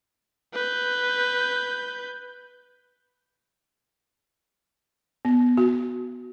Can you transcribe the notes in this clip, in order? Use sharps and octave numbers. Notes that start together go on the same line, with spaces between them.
B4 G6
B3
F#4